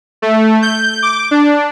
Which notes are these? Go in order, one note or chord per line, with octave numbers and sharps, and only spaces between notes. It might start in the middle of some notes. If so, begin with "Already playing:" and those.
A3
G6
D6
D4